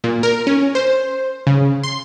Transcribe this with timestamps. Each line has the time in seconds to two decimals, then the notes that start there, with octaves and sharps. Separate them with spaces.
0.04 A#2
0.23 A#4
0.47 C#4
0.75 C5
1.47 C#3
1.83 C6